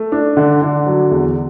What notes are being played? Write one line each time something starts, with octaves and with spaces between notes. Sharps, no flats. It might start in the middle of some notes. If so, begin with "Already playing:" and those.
Already playing: A3
D4
D3
D3
F#3
E2